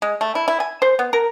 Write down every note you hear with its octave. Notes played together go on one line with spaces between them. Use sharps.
G#3
A3
E4
E4
G#5
C5
B3
A#4